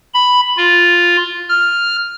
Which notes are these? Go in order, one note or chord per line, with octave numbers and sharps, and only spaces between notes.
B5
F4
F6